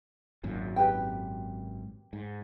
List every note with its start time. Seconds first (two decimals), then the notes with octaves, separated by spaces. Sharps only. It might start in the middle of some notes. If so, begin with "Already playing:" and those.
0.44 G#1 F#2 A#2
0.76 G4 B4 G5
2.13 G#2